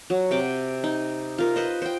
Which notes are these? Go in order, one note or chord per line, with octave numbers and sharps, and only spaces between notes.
F#3
C3 G5 D6
D#4
F4 A#4
B4 C5 D#5
C5 G5